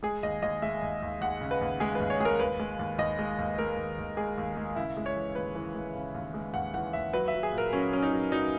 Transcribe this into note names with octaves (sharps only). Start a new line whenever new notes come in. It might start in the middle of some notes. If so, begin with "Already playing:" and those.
G#3 G#4
D#2 D#5
D#2 D#5
G#3 E5
D#2
D#2
D#2 F#5
C#3
B4
D#2
G#3 G#4
B4
D#2
C#5
G#3 G#4
A#4
D#2 B4
G#3
D#2
D#2 D#5
G#3
D#2
G#3 A#4
D#2
D#2
G#3 G#4
D#2
G#3
C#3 E4
G#3
C#5
E3
D#2 B4
E3
G#3
C#3
D#2
G#3
D#2 F#5
E3 F#5
D#2 E5
F#3 B4
E5
F#3
G#4
A#2
A#4
F#3 C#4
F#3 C#4
D#4
F#3
F#3 D#4